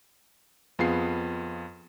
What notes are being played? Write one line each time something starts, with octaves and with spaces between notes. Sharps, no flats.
F2 B3 F4 G#4 C7